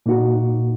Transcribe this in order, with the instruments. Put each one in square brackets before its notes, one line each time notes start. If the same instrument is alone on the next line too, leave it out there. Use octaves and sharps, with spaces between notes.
[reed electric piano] A#2 A#3 D#4 F#4